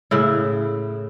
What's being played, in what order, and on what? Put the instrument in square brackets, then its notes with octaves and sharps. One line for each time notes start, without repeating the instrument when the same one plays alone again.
[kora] A2 C#3 E4